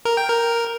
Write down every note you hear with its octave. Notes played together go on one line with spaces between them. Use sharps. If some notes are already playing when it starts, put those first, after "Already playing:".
A#4
G5
A#4